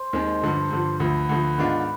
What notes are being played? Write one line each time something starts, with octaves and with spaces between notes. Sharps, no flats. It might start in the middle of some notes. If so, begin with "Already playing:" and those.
Already playing: C5
D#2 D#3 G#3 C4
G2 D3 F3
G2 D3 F3
D2 D3 F3 B4
D2 D3 F3
G#2 D#3 B3 D4 F4